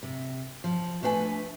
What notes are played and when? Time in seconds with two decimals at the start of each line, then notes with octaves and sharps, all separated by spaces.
0.03 C3
0.64 F3
1.03 A3 D4 B4 F5 G#5